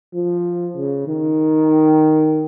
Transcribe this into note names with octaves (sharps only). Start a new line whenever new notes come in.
F3
C#3
D#3